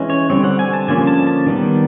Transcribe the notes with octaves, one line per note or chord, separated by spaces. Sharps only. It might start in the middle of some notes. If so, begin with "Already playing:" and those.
Already playing: E3 G#3 C#4
C#5
D3 G3 C4 C#5
F#5
G#5
A5
D3 F3 A#3 C#4 G#5
A5
A5
D#3 G3 B3